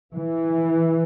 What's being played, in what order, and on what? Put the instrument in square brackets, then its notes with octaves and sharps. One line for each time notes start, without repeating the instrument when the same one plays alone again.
[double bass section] E3